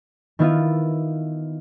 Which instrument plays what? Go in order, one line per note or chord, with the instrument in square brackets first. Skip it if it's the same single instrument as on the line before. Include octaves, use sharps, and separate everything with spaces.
[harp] D#3 B3 E4 F4